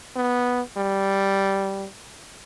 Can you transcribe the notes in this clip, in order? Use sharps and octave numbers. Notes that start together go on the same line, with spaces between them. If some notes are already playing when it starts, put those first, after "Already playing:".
B3
G3